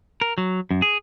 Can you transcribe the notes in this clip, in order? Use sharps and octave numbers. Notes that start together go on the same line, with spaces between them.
A#4
F#3
F#2
G#4